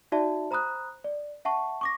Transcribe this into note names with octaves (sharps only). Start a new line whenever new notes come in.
D#4 F#4 D5 E5 A5
C5 A#5 B5 D#6 F#6
D5
E5 F#5 A5 C#6
C#6 D6 A#6